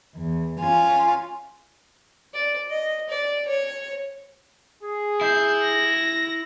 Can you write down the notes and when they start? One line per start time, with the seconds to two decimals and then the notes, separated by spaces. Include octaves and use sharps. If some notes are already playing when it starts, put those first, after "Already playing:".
0.15 E2
0.59 C#4 F4 G#5
2.34 D5
2.70 D#5
3.09 D5
3.47 C#5
4.83 G#4
5.21 E4 G6 C7
5.62 A#6